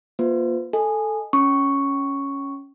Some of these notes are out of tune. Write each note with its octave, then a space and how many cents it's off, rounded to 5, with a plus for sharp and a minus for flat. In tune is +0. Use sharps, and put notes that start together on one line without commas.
A#3 +30 F4 +10 C5 -45
A4 +0 D#5 +0 G#5 +0
C#4 +0 C#6 +0